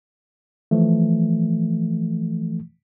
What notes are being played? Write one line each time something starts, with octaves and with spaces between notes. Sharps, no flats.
E3 F3 A3